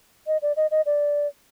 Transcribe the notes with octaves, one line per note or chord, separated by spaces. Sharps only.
D#5
D5
D#5
D#5
D5